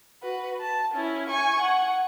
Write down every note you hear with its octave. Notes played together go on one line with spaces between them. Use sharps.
F#4 B4
A5
C#4 E4
G#5 C#6
F#5